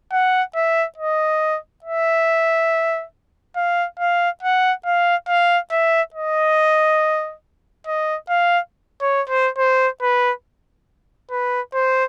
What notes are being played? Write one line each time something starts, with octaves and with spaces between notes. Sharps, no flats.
F#5
E5
D#5
E5
F5
F5
F#5
F5
F5
E5
D#5
D#5
F5
C#5
C5
C5
B4
B4
C5